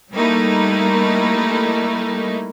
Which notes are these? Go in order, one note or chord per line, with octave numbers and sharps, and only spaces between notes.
G3 A3 A#3 D#4 E4